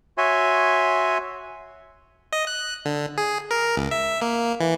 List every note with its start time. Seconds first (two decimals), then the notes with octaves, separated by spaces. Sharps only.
0.18 F#4 C#5 E5 G#5 C6
2.33 D#5
2.47 F#6
2.85 D3
3.18 G#4
3.51 A#4
3.77 C#2
3.91 E5
4.21 A#3
4.60 E3